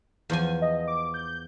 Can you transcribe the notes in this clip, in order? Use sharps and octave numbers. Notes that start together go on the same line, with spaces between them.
E2 F3 G#5
D#5
D6
G6